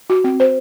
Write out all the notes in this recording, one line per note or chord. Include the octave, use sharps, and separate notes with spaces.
F#4
C4
C5